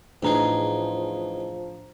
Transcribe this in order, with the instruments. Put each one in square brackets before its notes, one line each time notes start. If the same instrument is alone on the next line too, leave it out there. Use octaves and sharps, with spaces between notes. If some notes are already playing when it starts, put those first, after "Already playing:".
[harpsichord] E2 D#4 G#4 [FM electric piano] A2 [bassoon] F3 [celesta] D4 A#5